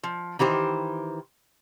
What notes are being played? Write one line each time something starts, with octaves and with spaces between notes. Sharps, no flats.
F3
D#3 E3 G4 C5